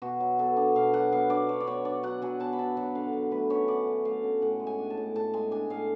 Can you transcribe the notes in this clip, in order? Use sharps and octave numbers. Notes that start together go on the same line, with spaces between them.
B2 F#4
F#3
B3 A4
D4
B2 F5
F#3 F#5
B3 F5
D4 D5
F#3 C#5
D5
B3 C#5
D4 D5
F#3 F#5
F#3 G#5
B3 A5
B5
D4 A5
F#3 F#5
D3 F5
F#3
A3 B4
C#4 C#5
D3 D5
F#3
A3 F5
C#4
A2 F#5
G#3
G#5
D4
A5
A2
A2 A5
G#3 G#5
D4 G#5
A2 F5